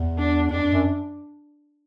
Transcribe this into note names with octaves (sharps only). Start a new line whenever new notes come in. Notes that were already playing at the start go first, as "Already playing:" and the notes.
Already playing: E2
D4
F2 D4
F2
F#2